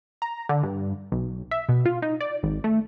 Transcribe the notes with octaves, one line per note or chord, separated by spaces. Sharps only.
A#5
D3
G2
B1
E5
B2
F4
D#4
D5
G#1
A3